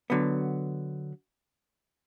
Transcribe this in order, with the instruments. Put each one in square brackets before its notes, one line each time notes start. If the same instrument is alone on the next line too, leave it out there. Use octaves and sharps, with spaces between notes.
[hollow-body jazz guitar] D3 F#3 B3